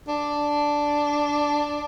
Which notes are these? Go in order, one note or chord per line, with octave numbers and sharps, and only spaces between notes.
D4